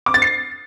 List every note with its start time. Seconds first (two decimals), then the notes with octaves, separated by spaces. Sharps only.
0.06 D6
0.14 A6
0.22 C7